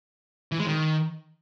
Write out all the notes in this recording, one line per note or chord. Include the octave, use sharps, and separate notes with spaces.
E3
G#3
D#3